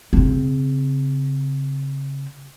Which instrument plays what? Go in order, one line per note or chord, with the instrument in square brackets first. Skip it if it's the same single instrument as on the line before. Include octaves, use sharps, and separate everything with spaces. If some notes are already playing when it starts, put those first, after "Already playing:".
[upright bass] C#3 C4